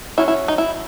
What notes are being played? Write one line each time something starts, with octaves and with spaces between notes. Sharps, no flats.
F#3 C#4 E4
E4
D#4
E4